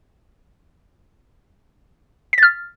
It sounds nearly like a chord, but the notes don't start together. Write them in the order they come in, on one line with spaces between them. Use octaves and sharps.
B6 A6 F6